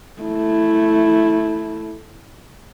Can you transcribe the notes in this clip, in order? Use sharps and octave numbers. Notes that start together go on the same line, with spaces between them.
A3 E4